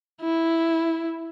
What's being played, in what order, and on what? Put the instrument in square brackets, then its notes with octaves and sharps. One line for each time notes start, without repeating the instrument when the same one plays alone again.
[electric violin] E4